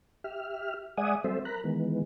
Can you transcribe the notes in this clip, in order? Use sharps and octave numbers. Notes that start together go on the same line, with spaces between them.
G4 E5 F6
G#3 D5 E5 F#5 G#5 D#6
F#3 G3 C4 A4 C5 E5
A#4 A#5 B5 F#6
D#3 E3 G#3 B3